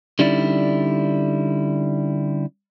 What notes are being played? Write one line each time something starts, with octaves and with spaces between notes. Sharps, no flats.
D3 G3 C#4 D#4 E4 D5